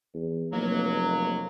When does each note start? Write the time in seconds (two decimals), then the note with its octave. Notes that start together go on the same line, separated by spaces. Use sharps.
0.14 E2
0.53 F1 B2 F#3 A#3